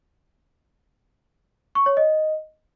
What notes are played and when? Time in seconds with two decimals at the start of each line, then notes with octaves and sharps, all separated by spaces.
1.75 C#6
1.86 C#5
1.97 D#5